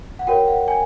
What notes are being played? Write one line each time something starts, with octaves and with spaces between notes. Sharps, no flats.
F#5
F#4 A#4 C#5 G5
F#5
G#5